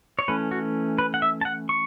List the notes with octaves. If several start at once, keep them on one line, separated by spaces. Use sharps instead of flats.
C#5
E3 A3 C#4 B4
F#4
B4
F#5
E5
A5
F#5
C#6